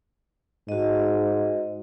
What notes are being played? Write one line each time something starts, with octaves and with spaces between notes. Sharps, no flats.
G#2 F#4 D#5